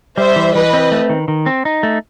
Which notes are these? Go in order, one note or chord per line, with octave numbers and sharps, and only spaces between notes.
G3 C5 E5
E3
E3 B4 D#5
C4
A3
D#3
D#3
C4
D#4
A3